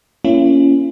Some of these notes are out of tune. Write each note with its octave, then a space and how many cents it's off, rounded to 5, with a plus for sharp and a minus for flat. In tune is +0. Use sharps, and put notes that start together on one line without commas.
A#3 +0 C#4 +0 E4 +45